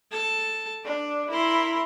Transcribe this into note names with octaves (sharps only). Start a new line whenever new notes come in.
A4 A5
D4 D5
E4 A#4 C6